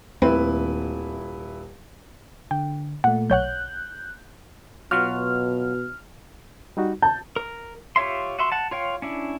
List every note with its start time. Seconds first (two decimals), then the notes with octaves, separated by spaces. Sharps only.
0.22 D#1 D#2 A3 C4 E4 B4
2.51 D3 G5
3.04 A#2 A3 F#5
3.30 B1 C#5 F#5 F#6 G6
4.91 B2 F#3 F4 F#4 F6
6.77 G3 D#4 F#4
7.02 A5 G6
7.36 A#4
7.96 F4 G4 C#5 E5 C6
8.39 F#4 E5 C6
8.52 F#5 A5
8.71 F4 C#5 F5 G5
9.02 C#4 D4 E4